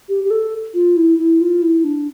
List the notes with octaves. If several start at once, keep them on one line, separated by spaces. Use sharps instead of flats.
G4
G4
A4
F4
E4
E4
F4
E4
D4